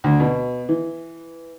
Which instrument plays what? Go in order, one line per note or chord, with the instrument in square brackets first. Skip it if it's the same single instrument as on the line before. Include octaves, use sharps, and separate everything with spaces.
[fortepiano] D2
B2
E3